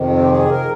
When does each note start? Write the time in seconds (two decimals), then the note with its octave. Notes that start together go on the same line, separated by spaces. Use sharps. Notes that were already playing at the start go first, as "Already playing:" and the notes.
Already playing: F2 C3 D#3
0.09 C4
0.20 G4
0.29 G#4
0.49 A#4